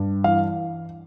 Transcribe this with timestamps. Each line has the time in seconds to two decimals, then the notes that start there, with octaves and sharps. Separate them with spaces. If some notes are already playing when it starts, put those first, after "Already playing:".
Already playing: G2
0.24 E3 F5